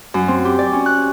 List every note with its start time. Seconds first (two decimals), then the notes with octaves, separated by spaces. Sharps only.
0.14 F#2
0.28 C4
0.45 G4
0.59 D5
0.73 C#4
0.86 F#6